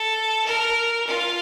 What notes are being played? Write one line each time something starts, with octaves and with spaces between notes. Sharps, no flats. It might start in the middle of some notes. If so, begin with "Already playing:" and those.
Already playing: A4
A#4
F4